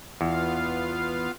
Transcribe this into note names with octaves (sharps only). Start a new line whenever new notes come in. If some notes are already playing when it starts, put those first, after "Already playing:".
E2 B3 F4 F5